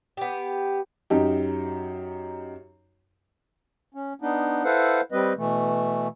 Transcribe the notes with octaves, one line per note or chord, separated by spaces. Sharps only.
B3 G4
F#2 D#4 G4
C#4
B3 D4 D#4
E4 A4 B4 C5 F5 F#5
G3 C4 B4 D#5
B2 E3 A3